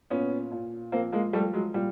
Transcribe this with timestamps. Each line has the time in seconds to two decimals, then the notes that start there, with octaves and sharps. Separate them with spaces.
0.10 A#2 B3 C#4
0.51 A#2
0.92 F3 A#3 C4
1.12 G#3 A#3
1.33 F3 G3 A3
1.53 F#3 G#3
1.74 A#2 G3